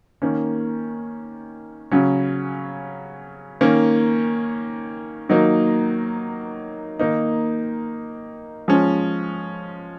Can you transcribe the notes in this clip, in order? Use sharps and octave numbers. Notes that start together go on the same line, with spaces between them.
D#3 A#3 C#4
C#3 F#3 C#4
D#3 A#3 C#4
D#3 F#3 A#3 D#4
D#3 A#3 D#4
F3 G#3 C#4